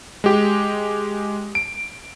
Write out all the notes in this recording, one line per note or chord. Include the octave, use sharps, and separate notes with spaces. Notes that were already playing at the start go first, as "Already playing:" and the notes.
G#3 G4
D7